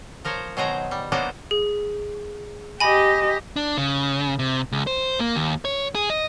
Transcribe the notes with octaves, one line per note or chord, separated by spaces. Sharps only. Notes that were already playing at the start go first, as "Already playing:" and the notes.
F3 A#4 C5 C#5
B2 D#3 F#3 C5 G#5 A#5
G3
F#3 A#3 B3 D4 D#4 C5
G#4
G4 D#5 G#5 B5
D4
C#3
C3
C#2
C5
A#3
D#2
C#5
G#4
D#5